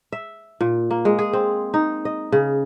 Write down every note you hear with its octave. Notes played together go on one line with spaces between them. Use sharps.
E5
A#2
A#3
G#3
G#4
C4
D#4
D#5
C#3